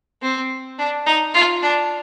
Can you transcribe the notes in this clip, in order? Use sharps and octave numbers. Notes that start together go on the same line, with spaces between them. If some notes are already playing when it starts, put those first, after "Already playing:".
C4
D4
D#4
F4
D4